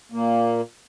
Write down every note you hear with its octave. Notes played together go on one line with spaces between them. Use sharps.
A#2 A#3